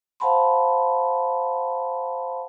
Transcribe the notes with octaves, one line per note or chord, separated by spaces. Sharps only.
C5 F5 F#5 A5 B5 C6